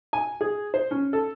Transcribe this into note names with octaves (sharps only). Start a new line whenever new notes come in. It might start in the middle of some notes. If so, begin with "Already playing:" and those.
G#5
G#4
C5
C#4
A4